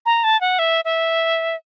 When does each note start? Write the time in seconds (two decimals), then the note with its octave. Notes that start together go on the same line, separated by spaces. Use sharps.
0.06 A#5
0.24 A5
0.41 F#5
0.59 E5
0.85 E5